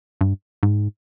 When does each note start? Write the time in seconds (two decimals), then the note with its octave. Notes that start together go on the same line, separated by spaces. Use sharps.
0.21 G2
0.63 G#2